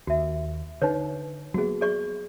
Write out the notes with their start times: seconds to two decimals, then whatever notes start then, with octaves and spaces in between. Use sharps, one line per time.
0.07 D#2 F#4 E5
0.82 D3 D#4 B4 C#5
1.54 F#3 A#3 B3 F#4 G#4
1.81 G#4 D5 C#6